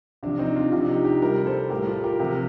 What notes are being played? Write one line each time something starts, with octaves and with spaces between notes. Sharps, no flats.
C3 F3 D4
C4 D#4
D4 F4
C3 F3 D4 F4
D#4 G4
D#4 G4
C3 G3 G4 A#4
A4 C5
A2 G3 G4 A#4
F4 A4
G4 A#4
C3 F3 G4 A#4